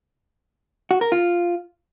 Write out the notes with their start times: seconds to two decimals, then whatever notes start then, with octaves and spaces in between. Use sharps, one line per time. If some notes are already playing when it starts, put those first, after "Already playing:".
0.91 F#4
1.01 A#4
1.12 F4